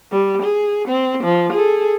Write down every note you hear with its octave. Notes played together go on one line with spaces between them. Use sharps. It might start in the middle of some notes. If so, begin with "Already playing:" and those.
G3
G#4
C4
F3
G#4 A4